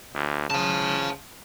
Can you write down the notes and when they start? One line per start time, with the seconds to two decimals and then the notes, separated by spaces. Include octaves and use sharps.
0.15 D2
0.50 C#3 F5 A5